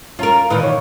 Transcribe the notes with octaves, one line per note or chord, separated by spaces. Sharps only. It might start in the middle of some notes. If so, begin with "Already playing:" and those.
C#4 F4 A#4 A#5
A#2 D#3 E3 B4
C#5